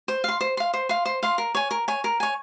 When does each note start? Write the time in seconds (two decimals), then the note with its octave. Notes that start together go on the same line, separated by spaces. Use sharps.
0.08 C5
0.24 F5 C6
0.41 C5
0.57 F5 C6
0.74 C5
0.89 F5 C6
1.05 C5
1.23 F5 C6
1.38 A#4
1.55 C#5 G#5
1.71 A#4
1.88 C#5 G#5
2.04 A#4
2.20 C#5 G#5